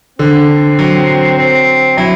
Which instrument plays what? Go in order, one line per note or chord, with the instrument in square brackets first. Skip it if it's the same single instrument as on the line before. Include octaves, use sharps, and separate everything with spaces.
[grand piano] D3 [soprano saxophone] C4
[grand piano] F#3
[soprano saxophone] C4
[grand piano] F#3 [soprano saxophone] E4